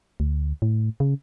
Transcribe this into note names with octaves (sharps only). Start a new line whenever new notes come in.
D2
A2
C#3